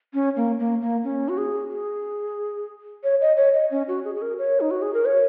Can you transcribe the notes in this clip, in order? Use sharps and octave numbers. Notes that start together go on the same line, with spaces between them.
C#4
A#3
A#3
A#3
C#4
F#4
G#4
G#4
C#5
D#5
C#5
D#5
C#4
F#4
G#4
G#4
A#4
C#5
D#4
F#4
G#4
A#4
C#5